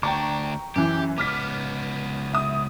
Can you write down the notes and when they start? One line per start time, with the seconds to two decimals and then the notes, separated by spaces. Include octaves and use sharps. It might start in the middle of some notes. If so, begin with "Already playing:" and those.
0.03 D2 D4 G5 A#5 C#6
0.76 F#2 E3 G4
1.18 C#2 B3 D6 F6 B6
2.33 E5 D#6